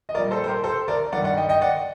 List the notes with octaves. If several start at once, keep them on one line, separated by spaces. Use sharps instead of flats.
D#5
A#2 G3 A#4 D5
A4 C5
C5
G4 A#4
A4 C5
A#4 D5
G2 D#3 G3 D5 F#5
D5 F#5
D#5 G5
D#5 G5
D5 F#5